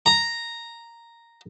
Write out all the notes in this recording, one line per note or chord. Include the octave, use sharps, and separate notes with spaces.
A#5